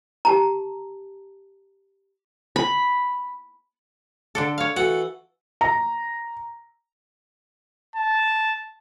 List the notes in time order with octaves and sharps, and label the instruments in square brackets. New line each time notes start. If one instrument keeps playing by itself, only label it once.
[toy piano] G4 A5 A#5
[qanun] B5
[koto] D3 D4 A4
C#5 F5
[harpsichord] E3 F#4 A4 [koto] F#5
[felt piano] A#5
[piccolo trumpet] A5